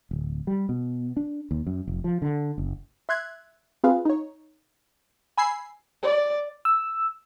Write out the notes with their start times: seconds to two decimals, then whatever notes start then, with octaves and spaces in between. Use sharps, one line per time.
0.11 D1
0.47 G3
0.69 B2
1.17 D4
1.51 D#2
1.67 F#2
1.87 F1
2.04 F3
2.22 D3
2.58 F#1
3.09 E5 C6 F#6 G#6
3.84 C4 F4 G#4 B4 F5
4.05 D#4 C#5
5.37 G#5 B5 E6 G#6 C7
6.02 D5
6.65 E6